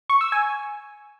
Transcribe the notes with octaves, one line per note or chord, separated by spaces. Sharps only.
C#6
E6
G#5